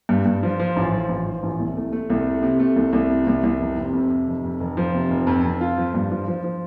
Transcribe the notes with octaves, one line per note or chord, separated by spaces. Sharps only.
G2
G2
F3
F3
A1
F3
A1
F3
A1
C2
A3
A3
C2
A3
C3
A3
C2
C2
C3
C2
C2
F1
C3
F2
C3
F1
F2
F1
F3
C3
F1
F2
F2
F4
F3
G2
F3
F3
F3